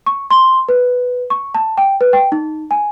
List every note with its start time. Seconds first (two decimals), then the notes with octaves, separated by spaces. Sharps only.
0.06 C#6
0.31 C6
0.69 B4
1.30 C#6
1.54 A5
1.77 G5
2.01 B4
2.13 G5
2.32 D#4
2.71 G#5